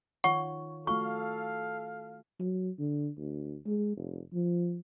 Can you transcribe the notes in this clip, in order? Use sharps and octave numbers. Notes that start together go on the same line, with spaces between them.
D#3 F4 C#5 F#5 C#6
A3 F4 F#4 A4 F5 C#6
F#3
D3
D2
G#3
F1
F3